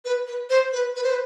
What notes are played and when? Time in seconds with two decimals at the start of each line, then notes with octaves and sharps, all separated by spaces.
0.05 B4
0.27 B4
0.50 C5
0.73 B4
0.96 B4
1.03 C5
1.10 B4